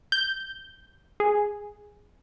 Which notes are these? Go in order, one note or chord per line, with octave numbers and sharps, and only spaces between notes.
G6
G#4